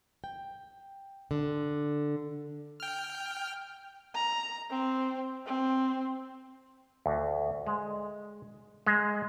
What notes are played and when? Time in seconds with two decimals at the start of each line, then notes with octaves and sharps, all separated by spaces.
0.24 G5
1.31 D3
2.80 G5 F6
4.15 A#5
4.70 C4
5.46 C4
7.06 D2
7.67 G#3
8.87 G#3